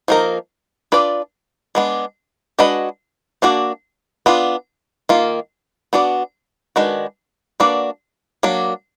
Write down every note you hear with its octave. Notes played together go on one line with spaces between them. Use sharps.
F3 A#3 D#4 A#4
D4 F4 B4 D5
G#3 B3 D4
G#3 D4 F#4 B4 D#5
A#3 D4 F#4 D5
B3 D4 F4
D#3 A#3 F4
B3 D4 F#4 D5
D#3 G#3 D4 F#4 B4
A#3 D4 F#4 B4 D5
F#3 A#3 D4